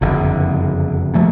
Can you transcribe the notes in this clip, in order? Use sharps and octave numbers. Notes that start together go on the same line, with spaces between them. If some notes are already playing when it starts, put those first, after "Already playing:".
F#1 F2 D3
A#2 F3 A3